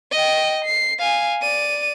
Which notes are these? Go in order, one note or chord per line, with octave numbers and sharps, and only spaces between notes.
D#5 G5
C7
F5 G#5
D5 D#7